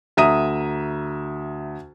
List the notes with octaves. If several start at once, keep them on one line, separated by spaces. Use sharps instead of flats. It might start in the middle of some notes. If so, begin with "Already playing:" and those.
D2 E5 A#5 D#6 D#7